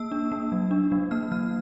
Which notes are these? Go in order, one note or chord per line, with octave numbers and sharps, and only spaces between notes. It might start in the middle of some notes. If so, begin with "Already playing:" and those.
Already playing: A#3 E6
D4
A#3
F#3
D4
F#3
A#3 F6
F#3 F6